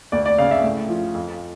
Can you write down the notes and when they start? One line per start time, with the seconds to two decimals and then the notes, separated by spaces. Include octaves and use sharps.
0.12 D2 D5
0.26 D5
0.38 C#3 F5
0.51 E5
0.63 A2
0.89 F3
1.15 F2